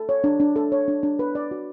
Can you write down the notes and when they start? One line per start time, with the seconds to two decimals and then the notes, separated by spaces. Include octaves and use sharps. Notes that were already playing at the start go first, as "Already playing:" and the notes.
Already playing: A4
0.09 C#5
0.24 D4
0.40 D4
0.56 A4
0.72 C#5
0.88 D4
1.03 D4
1.19 B4
1.35 D5
1.51 F#4